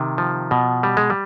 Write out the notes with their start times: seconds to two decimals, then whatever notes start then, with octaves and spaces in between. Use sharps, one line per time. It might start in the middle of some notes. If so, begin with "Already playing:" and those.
Already playing: C3 D#3
0.18 F3
0.51 B2
0.83 G3
0.97 G#3
1.10 G3